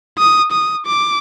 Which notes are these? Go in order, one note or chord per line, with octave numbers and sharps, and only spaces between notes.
D#6
D#6
D6